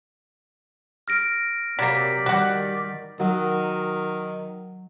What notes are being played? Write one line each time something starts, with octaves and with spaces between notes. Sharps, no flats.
F6 A#6 D7
C3 F#3 A#3 G4 D5 B6
D#3 G3 F#4 F#5 D6
D#3 F#3